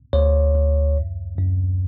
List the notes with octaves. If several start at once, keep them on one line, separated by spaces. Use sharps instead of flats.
D2 C#5
D2
F#2
F#2